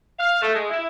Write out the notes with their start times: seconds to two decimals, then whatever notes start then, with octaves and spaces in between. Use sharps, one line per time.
0.18 F5
0.42 A3
0.54 G#3
0.70 E4